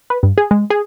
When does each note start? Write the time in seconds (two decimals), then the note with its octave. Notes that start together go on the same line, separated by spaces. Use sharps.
0.10 B4
0.23 G2
0.38 G#4
0.51 G#3
0.70 G#4